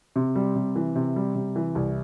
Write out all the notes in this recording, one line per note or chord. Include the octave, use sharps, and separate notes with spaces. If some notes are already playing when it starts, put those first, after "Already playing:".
C3
G3
C3
E3
C3
G3
C3
E3
C2